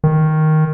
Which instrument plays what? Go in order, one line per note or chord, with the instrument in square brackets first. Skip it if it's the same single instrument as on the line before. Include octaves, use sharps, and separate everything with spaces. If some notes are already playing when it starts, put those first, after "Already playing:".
[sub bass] D#3